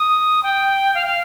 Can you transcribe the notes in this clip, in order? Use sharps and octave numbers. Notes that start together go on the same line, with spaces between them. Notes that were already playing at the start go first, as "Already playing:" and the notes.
Already playing: D#6
G5
F5
F5